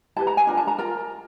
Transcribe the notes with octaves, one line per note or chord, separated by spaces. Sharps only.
E4 G4 B4 A5
A#5
G#5
D4 F4 A#4
A5
A#5
F4 A#4 A#5